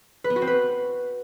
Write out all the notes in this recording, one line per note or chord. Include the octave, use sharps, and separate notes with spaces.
B4
B3
F#4
C4
B4